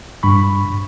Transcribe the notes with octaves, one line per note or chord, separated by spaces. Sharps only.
G2 B5 C#6